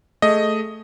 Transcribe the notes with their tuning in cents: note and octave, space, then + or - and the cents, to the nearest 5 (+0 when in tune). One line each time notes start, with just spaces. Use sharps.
A3 +0 G#4 +0 D#5 +0